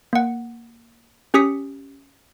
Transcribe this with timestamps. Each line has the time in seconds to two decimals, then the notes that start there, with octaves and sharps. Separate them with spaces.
0.13 A#3 F#5
1.34 C#4 G4 D#6 B6 C#7